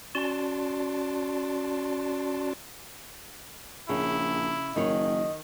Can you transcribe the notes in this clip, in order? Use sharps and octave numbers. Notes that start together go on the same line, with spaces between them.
C#4 F#4 D5 A5 C6
A#1 C#3 E4
F#1 D#3 C#5 D#5